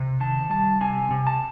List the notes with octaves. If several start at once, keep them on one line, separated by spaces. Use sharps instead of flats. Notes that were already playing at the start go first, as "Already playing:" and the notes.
Already playing: C3
D#3 A5
G3 A5
C3 G#5
C3
A5